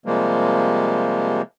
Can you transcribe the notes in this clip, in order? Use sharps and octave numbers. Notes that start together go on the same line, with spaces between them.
C3 F3 G3 G#3 A#3